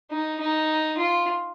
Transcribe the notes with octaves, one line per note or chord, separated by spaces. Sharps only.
D#4
D#4
F4